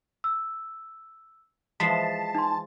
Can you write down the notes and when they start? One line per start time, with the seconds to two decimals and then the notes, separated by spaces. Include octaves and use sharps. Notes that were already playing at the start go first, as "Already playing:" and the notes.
0.24 E6
1.80 E3 F3 G#3 A5 B6 C7 E7
2.35 D#4 C6